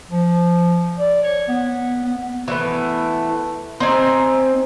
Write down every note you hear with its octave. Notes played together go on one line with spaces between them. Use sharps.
F3
D5
C#5
B3
B3
E3 A3 B3
C4 D#4 G#5